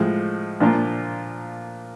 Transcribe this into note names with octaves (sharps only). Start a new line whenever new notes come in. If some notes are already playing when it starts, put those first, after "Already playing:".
Already playing: A2 F3 G#3
A#2 F3 A#3 D4 F4